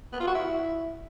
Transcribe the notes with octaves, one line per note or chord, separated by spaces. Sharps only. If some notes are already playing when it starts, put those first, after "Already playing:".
B3
F4
F#4
E4